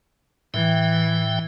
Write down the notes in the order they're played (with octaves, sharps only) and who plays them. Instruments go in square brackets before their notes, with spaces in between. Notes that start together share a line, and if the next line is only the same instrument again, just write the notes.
[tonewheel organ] A2 E5 G5 [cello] E3